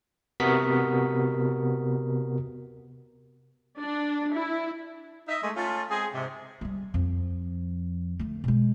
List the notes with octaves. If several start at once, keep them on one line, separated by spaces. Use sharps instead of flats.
C3 B3 F#4 A#4 D#6 B6
D4
E4
D#4 E5
G#3 A3
A3 C#4 F4
G#3 C4 G#4
G#2 C3
G3 G#3
F2 F3
D3 A3
B2 G#3